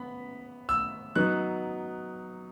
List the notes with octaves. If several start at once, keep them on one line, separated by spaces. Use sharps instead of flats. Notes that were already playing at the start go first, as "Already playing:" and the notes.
Already playing: B3 B5
E6
F#3 B3 D#4 F#6